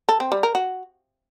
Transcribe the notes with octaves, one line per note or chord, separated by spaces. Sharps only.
A4
C4
G3
A#4
F#4